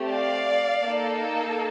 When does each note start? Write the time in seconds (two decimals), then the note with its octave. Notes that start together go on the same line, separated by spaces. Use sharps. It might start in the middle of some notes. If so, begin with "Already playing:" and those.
Already playing: A3 C4 G4
0.10 D5 F5
0.83 A#3 D#4 A4